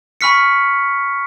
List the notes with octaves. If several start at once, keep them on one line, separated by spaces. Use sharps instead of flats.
G#5 B5 C#6 F6 B6 C#7